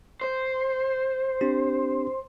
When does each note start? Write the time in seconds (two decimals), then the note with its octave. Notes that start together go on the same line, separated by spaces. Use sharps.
0.21 C5
1.41 C4 D4 G4